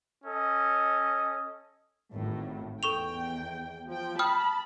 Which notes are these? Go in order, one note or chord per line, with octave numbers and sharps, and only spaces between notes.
C#4 A4 D#5
G#1 A2
E2 A4 G5 C#6 F7
F3 G5
G5 A5 B5 D#6 F6